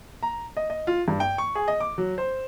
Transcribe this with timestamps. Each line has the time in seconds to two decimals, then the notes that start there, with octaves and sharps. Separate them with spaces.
0.23 A#5
0.57 D#5
0.70 D#5
0.87 F4
1.08 G2
1.20 G5
1.38 C#6
1.55 G#4
1.68 D#5
1.80 D6
1.98 F#3
2.18 C5